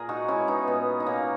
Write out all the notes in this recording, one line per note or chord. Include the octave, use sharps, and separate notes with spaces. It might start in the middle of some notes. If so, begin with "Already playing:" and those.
Already playing: A#2 G#4 A#4
D#4 F#4
G#3 C#4 E4
B3 D#4
A#2 B3
D#4
F#3 A#3 C#4